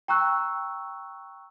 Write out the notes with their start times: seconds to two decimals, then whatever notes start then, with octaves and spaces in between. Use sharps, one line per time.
0.08 G5 A#5 C#6 E6 F#6